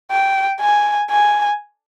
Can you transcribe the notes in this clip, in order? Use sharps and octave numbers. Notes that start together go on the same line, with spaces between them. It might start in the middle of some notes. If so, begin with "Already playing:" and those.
G5
G#5
G#5